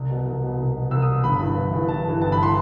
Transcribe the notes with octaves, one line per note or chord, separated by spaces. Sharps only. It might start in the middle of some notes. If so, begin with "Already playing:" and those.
Already playing: C2
B2
C2
B2
C2
B2
C2 E6
D#6
B2
G1 B5
G2 E3
G1
G2 E3
G1 A5
G2 E3
G1 A5
B5
E3 C6